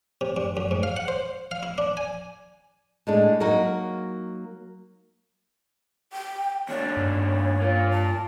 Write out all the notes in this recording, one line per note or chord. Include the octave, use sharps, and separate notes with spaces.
C3
G2
F#2
G#2
F5
F#5
C5
F5
E4
D4
G#5
A2 G#3 D4
F#3 A#3 D#4 F#4 A#4
G5
D#2 D4 C#5
G2
A#3 F4
A5